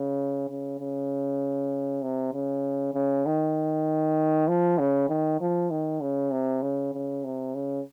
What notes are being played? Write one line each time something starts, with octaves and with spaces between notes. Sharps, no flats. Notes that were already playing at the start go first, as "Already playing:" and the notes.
Already playing: C#3
C#3
C#3
C3
C#3
C#3
D#3
F3
C#3
D#3
F3
D#3
C#3
C3
C#3
C#3
C3
C#3